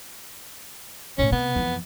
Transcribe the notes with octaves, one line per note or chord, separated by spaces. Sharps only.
A2 C#3 C#4
C3 B3
F2 E3